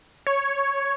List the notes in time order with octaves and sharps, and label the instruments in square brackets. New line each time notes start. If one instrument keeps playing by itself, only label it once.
[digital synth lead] C#5